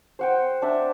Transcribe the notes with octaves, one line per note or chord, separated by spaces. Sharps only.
C5 F#5 G5
D4 E5